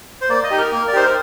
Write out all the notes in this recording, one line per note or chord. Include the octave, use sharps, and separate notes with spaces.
C5
A#3 D5
D#5
D#4 G4
A#4
A#3
D5
D#4 G4 C5
A#4